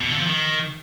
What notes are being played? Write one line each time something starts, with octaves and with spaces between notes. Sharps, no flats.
B2
D3
F3
D#3